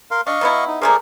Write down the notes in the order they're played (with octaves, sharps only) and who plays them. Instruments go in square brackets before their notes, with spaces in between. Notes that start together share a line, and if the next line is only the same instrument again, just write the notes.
[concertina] A#4 F5 C6
[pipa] D4 [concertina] D#5 F5 C#6
[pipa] F#3 B3 E4
[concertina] D#4
[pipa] F3 A3 A#3 [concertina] G#4 A#4 D5